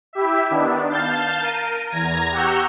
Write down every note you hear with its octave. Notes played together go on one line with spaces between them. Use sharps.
E4 G4 E5
D#3 B3 D4
F5 A5 G6 A6
A#4 D#7
E2 A#5 G#6 A#6
G4 F#5 A#5 C#6 E6 G6